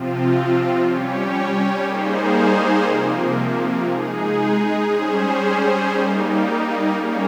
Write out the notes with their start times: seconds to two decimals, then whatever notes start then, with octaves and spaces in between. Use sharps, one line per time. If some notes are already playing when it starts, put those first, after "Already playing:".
Already playing: C3 F3 C4 F4
0.78 G3 C#4 G4 C#5
1.82 G3 A#3 D#4 G#4 C5
2.83 C3 F3 A#3
3.86 G#3 D#4 G#4
4.88 G3 C#4 G#4 C5
5.90 G3 A#3 D#4
6.93 G3 A#3 C#4 G#4 C#5